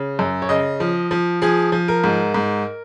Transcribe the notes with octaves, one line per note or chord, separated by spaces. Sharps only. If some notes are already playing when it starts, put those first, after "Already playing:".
Already playing: C#3
F#2
C#5
C#3 D#5
F3
F3
F3 G#4
F3
A#4
G#2
G#2